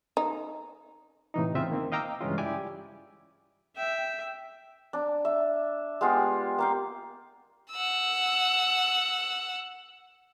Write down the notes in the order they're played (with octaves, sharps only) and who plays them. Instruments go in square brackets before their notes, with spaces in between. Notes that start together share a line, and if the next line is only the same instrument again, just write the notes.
[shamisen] D#4
[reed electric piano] A2 C3 E3 D#4
E2 C#3 C4 F4 E5
D#3 A#3 C4
D#5 F5 G5 A#5 D6 E6
G2 C#3 E3 G#3 C#4 F4
E4 G4 D5 G#5 D6
[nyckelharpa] E5 [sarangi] G5
[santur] D4
E5
G#3 B3 F4 G4
A#3 F5 G5
[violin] F#5 E6